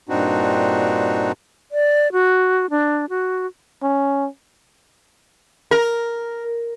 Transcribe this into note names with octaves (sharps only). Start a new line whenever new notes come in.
G2 A#2 C4 D4 D#4 F#4
D5
F#4
D4
F#4
C#4
A#4